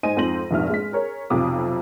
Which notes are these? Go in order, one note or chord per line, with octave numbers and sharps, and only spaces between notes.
G#2 C5 D#5 G#5 D#7
F2 G#2 C4 C5 A#6 F#7
F1 A#1 G#2 E5 F6
G#3 B6
G#4 A#4 C#5
B1 F2 C3 D6 D#6